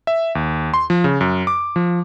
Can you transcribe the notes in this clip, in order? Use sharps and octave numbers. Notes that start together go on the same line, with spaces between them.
E5
D#2
C6
F3
C#3
F#2
D6
F3